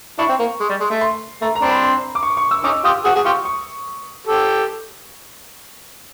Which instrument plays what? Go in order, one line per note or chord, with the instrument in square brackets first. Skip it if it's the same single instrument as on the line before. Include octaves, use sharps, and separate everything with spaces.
[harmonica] D4 E4 [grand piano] C#6
[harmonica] C4
A#3
G#3
G3
G#3
A3
[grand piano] C6
[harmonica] A3 [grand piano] A#5
[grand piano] A#5
[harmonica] C4 D4 [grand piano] C6
[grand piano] B5
C6
D6
C#6
C#6
E6
[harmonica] C#4 D#4 [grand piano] D6
[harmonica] F4 G4 [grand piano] D#6
[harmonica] F#4 G#4 [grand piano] D#6
[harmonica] F#4 G#4
[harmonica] F4 G4 [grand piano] C#6
[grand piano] C#6
[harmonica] G4 A4